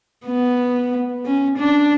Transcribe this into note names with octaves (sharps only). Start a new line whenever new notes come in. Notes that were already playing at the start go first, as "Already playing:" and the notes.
B3
C#4
D4